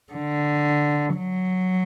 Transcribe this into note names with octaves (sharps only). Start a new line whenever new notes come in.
D3
F#3